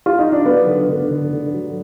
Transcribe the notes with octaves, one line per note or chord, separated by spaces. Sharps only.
F4
D#4
D4
F#3 B3
D3
D3
D3
D3
F#3